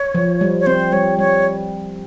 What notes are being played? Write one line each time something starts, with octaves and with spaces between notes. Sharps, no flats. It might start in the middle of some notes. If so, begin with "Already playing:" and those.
Already playing: C#5
F3
G3
C#5
C4 C5
G3 C#5
G3 C#5